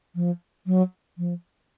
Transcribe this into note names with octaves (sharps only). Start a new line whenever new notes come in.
F3
F#3
F3